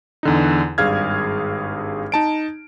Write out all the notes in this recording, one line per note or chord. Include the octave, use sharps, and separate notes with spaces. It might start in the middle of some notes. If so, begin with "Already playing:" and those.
E2 D3 D#4
G#1 G2 G#4 F5 F6 G#6
D#4 A5 D7